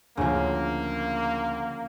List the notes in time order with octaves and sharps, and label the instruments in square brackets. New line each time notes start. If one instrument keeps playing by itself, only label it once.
[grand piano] D2 [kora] C#3 F3 [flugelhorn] A#3